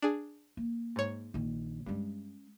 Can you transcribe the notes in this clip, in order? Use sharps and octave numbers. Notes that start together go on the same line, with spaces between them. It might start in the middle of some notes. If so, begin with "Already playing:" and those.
D4 G#4
A#3
G#2 C#5
A#1 D#3
G2 G#3 C#4